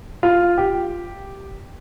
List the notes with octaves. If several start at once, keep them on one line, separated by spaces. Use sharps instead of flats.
F4
G4